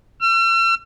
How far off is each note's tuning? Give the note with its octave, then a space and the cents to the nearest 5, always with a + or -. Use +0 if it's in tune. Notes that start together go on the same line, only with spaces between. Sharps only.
E6 +45